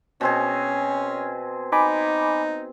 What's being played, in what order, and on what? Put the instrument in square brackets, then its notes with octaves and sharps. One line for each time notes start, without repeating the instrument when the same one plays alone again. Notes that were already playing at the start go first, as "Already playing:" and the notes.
[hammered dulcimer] B2 C4 G#4 [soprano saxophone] C#4
[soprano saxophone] D#4 [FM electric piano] G#5 B5 D6